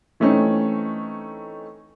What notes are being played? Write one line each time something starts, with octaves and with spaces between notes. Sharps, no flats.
E3 A3 C4 C#4 D#4